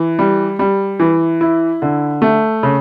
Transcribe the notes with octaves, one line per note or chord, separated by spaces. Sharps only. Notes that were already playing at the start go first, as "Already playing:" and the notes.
Already playing: E3
G3
G3
E3
E4
D3
A3
C#3